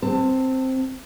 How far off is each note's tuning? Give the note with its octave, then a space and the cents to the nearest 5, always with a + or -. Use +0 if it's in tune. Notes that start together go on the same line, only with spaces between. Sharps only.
C4 +0 A5 +25